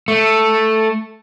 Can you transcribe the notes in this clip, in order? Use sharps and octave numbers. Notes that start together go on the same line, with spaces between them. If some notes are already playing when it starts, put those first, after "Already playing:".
A3